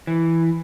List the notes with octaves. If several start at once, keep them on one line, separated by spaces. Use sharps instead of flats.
E3